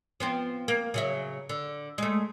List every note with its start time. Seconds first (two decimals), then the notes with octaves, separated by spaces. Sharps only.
0.20 F3 B3 C4
0.68 A#3
0.94 C#3 F#3 E5
1.49 D3
1.98 G#3 A3